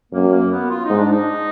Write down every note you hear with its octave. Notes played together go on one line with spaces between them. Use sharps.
F#2 A#3
A#3
B3
F4
D#4
G#2
D4
D#4